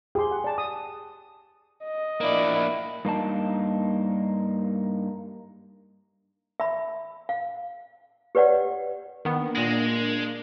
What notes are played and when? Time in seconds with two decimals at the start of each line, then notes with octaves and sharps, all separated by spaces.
0.15 G4 G#4 C6
0.31 F#5
0.44 D5 A5
0.58 D#6
1.85 D#5
2.21 A#3 D4 E4 D5
3.05 G2 A#3 D#4 A5
6.60 E5 B5
7.29 F5
8.35 G4 B4 C#5 D5 F#5
9.25 D#3 A#3 B3 D4 A#4
9.56 A#2 G#3 A#6